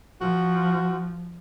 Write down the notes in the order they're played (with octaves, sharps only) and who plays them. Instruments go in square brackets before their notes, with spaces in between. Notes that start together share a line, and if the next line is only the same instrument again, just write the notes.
[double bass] F3 [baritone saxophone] F#4